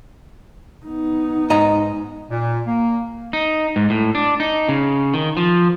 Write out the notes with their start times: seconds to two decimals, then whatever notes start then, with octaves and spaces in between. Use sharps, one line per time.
0.85 B3 D#4
1.50 G#2 D#5 A#5
2.30 A#2
2.66 A#3
3.33 D#4
3.76 G#2
3.90 A2
4.15 D4
4.40 D#4
4.69 C#3
5.14 D#3
5.37 F3